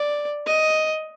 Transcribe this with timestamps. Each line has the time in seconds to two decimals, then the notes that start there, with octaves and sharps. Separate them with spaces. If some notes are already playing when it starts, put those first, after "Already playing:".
Already playing: D5
0.46 D#5